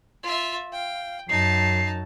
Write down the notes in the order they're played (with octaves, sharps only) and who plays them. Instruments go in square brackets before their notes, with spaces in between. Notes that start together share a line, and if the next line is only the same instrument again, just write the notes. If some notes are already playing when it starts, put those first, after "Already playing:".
[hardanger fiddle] F4 E5
[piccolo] F5 [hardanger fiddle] G5
[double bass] F#2 [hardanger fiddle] D#4 A5 [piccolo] C7